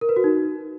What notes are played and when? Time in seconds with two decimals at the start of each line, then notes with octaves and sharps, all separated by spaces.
0.01 A#4
0.09 B4
0.16 F#4
0.24 D#4